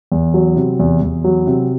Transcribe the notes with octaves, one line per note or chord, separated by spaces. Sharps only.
E2
F#3
C3
E2
E2
F#3
C3